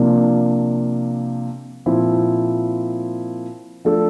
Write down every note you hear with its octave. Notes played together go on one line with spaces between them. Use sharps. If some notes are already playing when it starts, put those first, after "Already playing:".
Already playing: C3 F3 A#3 D4
A#2 F3 C4 E4
F3 A3 D4 A4